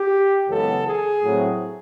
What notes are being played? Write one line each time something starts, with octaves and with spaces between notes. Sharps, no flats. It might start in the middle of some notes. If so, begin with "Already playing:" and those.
Already playing: G4
F#2 C#3 E3 G#3 B3 A4
G#4
A2 F#3 A3 C4